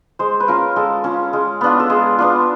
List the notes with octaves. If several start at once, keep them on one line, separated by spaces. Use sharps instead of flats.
G#3 C5
B4
C#4 F4 A#4
G#3 A4
C#4 F4
G#3
B3 D4 F4
A4
G#3 G#4
B3 D4 F4